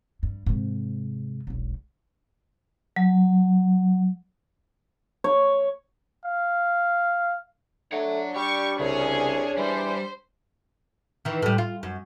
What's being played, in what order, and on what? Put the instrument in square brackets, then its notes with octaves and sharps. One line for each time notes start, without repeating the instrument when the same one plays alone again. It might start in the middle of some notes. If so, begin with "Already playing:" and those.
[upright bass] G2
G#2 C3
E1 B1
[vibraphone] F#3
[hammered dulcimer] C#5
[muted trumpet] F5
[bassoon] A3 [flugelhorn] D4 [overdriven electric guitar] C#5 F#5
[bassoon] G3 [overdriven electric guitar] G4 [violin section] C#6
[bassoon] C2 [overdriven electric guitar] C#3 [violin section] C#4 G#4 C#5
[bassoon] E3 [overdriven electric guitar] G3 [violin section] C5
[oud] D#3 E3
A2 G3
F4
F#2